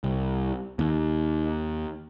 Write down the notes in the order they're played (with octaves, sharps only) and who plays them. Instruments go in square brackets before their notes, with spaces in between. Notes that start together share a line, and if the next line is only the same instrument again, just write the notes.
[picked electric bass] C2
D#2